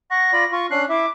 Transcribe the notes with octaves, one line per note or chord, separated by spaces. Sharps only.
F#5 C#6 A#6
F4 D5 B5
F4 C#6
C#4 D4 F#6 C7
E4 E5 D6